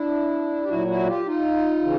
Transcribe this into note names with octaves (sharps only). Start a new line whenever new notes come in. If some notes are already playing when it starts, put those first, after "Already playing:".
Already playing: D4 E4
G4
A#2 F#3 E4 F#4
E4 F#4
F4 G4
D#4 F4
C#3 E3